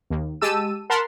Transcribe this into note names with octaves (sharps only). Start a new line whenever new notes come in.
D#2
G#3 G4 A5 E6 D#7
A#4 F#5 A5 B5 C6 F6